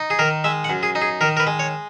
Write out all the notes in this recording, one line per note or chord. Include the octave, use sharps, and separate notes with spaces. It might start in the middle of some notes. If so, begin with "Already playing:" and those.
Already playing: D#4
G#4
D#3 A#4
G#3 E5
F#5
F#2
G#4
D#4
G#4
D#3 A#4
A#4
B4
G#3
C#5